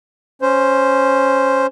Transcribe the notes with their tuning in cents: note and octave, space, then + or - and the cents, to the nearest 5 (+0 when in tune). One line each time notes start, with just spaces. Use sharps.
C#4 -5 C5 +0